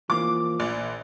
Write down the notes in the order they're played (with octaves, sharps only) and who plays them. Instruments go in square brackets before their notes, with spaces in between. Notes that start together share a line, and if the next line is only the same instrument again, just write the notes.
[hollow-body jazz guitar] E3 A#3 [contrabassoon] F3 [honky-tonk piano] D6
[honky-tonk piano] A#1 [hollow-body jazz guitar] D5